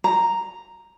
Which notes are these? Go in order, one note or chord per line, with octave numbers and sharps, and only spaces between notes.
A#5